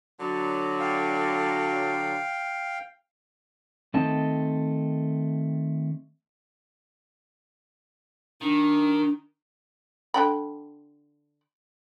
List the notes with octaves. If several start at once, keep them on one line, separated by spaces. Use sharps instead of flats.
D3 F#3
F5 G5
D#3 A3 C4 D#5 A5
D#3 D4
D3 G5 B5